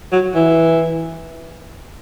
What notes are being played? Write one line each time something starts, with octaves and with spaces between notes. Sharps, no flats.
F#3
E3